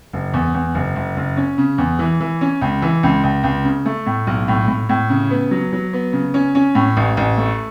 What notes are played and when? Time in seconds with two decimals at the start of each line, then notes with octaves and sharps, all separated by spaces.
0.13 F#1
0.34 E2
0.54 E2
0.75 F#1
0.96 F#1
1.17 F#1
1.37 C#4
1.58 C#3
1.78 E2
1.99 E3
2.21 E3
2.41 C#4
2.61 C#2
2.82 E3
3.03 C#2
3.24 C#2
3.44 C#2
3.65 C#3
3.86 A3
4.06 A2
4.27 B1
4.48 A2
4.68 A2
4.89 A2
5.10 C#3
5.31 B3
5.51 F#3
5.73 F#3
5.93 B3
6.13 C#3
6.34 C#4
6.55 C#4
6.75 A2
6.97 A1
7.17 A1
7.38 A3